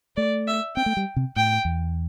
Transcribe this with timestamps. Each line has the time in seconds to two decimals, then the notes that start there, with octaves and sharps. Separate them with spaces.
0.16 A3 D5
0.47 E5
0.76 C4 G5
0.86 A3
0.97 G3
1.16 C3
1.36 A2 G5
1.65 E2